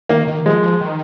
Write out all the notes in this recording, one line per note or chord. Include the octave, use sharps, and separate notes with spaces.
D#3 A#3
D#3
F3 G#3
F3
D#3